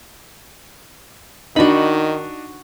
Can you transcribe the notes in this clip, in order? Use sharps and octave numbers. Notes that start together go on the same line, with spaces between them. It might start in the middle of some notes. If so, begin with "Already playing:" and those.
D#3 D4 D#4 F#4 B5